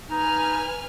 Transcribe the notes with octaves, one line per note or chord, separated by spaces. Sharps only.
D#4 B4 G#5 F6